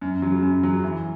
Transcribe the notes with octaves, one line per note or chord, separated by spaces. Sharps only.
F#2
C#3 F#3
F#2
C#3 F#3
E3